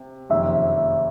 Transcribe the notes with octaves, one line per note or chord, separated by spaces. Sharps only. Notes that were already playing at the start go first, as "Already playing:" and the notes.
Already playing: C3
F#1 F2 C3 D#3 E5